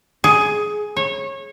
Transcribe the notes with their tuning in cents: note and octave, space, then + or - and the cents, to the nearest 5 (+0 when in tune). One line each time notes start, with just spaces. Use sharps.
G#4 +10
C#5 -25